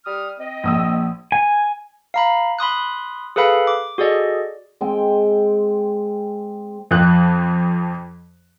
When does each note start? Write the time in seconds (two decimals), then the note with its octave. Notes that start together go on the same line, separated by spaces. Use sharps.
0.06 G3 D#6 F6
0.39 C4 D#5
0.64 A#1 D#6 E6
1.32 G#5
2.14 F5 A#5 B5
2.59 B5 C6 D#6 F#6
3.36 G#4 A4 B4 F5 B5
3.67 D6
3.98 F#4 G#4 A4 D5 D#5
4.81 G#3 C4 G5
6.91 F2 F3 F#6